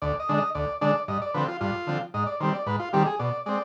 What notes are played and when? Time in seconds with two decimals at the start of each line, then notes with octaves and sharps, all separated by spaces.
0.02 D2 D5
0.20 D#5
0.29 D3 G#3 D4
0.38 D#5
0.55 D2 D5
0.81 D3 G#3 D4 D5
1.08 G2 D#5
1.22 D5
1.34 D3 F3 C4 B4
1.48 F4
1.61 G2 F4
1.87 D3 F3 C4
2.14 G#2 D#5
2.27 D5
2.40 D#3 G3 C4 C5
2.54 D5
2.66 G#2 B4
2.80 F4
2.93 D#3 G3 C4 G4
3.06 G#4
3.19 B2 D5
3.46 G#3 C4 D5